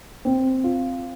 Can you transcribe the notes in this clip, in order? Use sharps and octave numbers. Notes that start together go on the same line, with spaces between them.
C4
F4